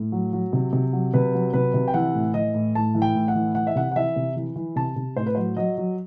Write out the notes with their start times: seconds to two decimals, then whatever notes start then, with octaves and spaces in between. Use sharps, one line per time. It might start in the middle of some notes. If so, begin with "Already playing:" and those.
Already playing: A2
0.12 F#3
0.33 F#3
0.53 C3
0.73 C3
0.93 F#3
1.14 C3 B4
1.34 F#3
1.54 C3 B4
1.74 C3
1.88 G5
1.94 E3 F#5
2.14 A2
2.34 E3 D#5
2.54 A2
2.75 A2 A5
2.95 E3
3.02 G5
3.15 A2
3.28 F#5
3.35 E3
3.55 E3 F#5
3.67 E5
3.75 C3 F#5
3.91 F#5
3.96 E3 E5
4.16 C3
4.36 E3
4.56 E3
4.76 C3 A5
4.96 C3
5.16 A2 C5
5.27 B4
5.35 F#3 C5
5.57 F#3 D#5
5.78 F#3